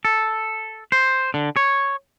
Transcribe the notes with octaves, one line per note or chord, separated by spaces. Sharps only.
A4
C5
D3
C#5